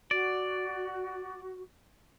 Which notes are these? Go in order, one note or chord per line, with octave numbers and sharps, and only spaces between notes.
F#4 D5